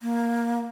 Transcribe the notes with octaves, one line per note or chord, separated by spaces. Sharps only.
A#3